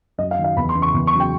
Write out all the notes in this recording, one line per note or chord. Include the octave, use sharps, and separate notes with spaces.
F#2 D#5
F5
D#3 F#3
F5
E2 B5
C6
C#3 E3
C#6
E2
C#6
C#3 F#3
G5